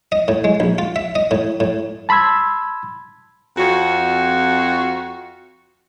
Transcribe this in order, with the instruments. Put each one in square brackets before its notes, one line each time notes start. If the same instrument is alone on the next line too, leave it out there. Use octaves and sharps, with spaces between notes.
[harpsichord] D#5
A2
G#3
A#1
F4
E5
D#5
A2
A2
[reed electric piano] A5 B5 C6 E6 G#6
[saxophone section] F2 F#4